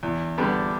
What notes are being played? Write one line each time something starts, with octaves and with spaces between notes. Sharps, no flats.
E2
D3 G3 B3 D4